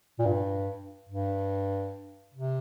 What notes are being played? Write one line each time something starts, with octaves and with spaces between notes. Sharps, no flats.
A#2
G2
G2
C3